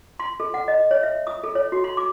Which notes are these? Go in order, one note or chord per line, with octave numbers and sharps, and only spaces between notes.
C6
A4
F#5
D#5
C#5
E5
D#6
A4
C#5
F#4
C6
D6